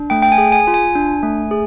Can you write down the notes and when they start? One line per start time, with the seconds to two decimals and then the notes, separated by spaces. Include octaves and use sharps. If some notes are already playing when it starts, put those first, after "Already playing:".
Already playing: D4
0.10 A3 G5
0.22 G5
0.32 G#5
0.38 G#4
0.52 G#5
0.67 F4
0.74 G#5
0.95 D4
1.23 A3
1.51 G#4